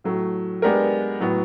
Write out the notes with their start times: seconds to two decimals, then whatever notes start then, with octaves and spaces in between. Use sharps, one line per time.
0.04 A2 F#3 A3
0.62 G#3 B3 D4 G4 A#4
1.21 A2 F#3 B3